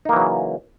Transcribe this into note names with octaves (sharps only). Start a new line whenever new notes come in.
C#3 E3 F#3 A#3 D#4